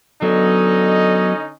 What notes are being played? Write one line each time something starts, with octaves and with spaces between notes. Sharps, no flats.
D3 F#3 B3 C#4 D#4 D#5